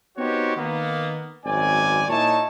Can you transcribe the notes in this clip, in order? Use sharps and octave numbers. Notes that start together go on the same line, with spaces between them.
B3 C4 D#4 F#4 G4 C#5
D#3 A#3 B3
G#1 F#2 C4 D5 G#5
A#2 D#4 E4 C#5 A5